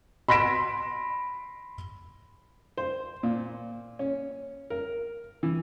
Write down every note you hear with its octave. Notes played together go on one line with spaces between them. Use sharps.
B5 C6 A#6 B6 D7 E7
C5
A#2
C#4
A#4
E3